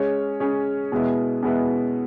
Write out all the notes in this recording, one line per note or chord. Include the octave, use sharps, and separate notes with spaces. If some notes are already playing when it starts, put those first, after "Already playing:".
Already playing: G#3 C#4 G#4 C#5
G#3 C#4 G#4 C#5
B2 G#3 B3 E4
B2 G#3 B3 E4